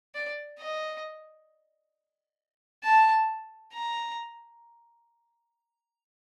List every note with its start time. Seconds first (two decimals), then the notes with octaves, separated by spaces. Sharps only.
0.15 D5
0.59 D#5
2.84 A5
3.74 A#5